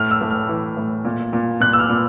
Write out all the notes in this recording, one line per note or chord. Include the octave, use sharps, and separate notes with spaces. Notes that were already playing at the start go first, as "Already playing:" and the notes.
Already playing: A2 F6
E6
A2
F6
E3
A2
A#2
A#2
A#2 F#6
E6
F6
A#2